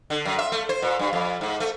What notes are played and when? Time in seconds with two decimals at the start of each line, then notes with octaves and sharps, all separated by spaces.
0.10 D3
0.25 F#2
0.39 E5
0.52 A3
0.69 C5
0.82 A#2
0.99 G2
1.13 F2
1.41 G#2
1.60 A3